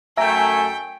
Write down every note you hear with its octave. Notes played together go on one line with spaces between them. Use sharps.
F#2 A3 E5 G5 G#5 A#5